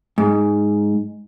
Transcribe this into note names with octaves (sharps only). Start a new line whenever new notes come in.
G#2